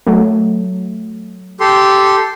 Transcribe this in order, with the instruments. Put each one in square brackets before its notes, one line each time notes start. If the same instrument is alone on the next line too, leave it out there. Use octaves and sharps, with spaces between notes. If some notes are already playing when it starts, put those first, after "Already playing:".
[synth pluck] F#3 A3
[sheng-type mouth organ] G4 A4 C6